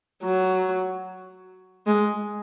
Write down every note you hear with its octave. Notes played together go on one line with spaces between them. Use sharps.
F#3
G#3